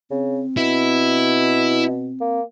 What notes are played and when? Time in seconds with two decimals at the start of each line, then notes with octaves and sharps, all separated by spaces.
0.11 C#3 C4
0.57 B2 E4
2.21 A#3